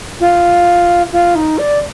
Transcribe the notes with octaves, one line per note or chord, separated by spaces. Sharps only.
F4
F4
D#4
D5